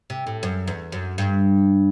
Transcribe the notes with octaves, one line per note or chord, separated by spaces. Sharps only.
C3
A2
F#2
E2
F#2
G2